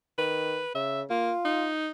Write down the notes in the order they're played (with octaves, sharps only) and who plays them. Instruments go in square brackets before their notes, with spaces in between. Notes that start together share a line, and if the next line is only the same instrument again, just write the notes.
[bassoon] D#3 [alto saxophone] B4
[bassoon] C#3 [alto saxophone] E5
[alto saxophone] A#3 [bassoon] F4
[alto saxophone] D#4